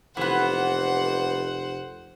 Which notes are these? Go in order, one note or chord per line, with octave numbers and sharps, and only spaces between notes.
F1 E3 B3 C5 F#5